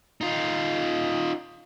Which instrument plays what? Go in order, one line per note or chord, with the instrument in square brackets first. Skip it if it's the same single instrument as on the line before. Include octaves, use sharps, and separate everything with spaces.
[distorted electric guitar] D#4 F4